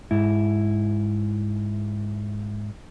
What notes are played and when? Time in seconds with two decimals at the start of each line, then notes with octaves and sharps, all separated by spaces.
0.11 G#2 E4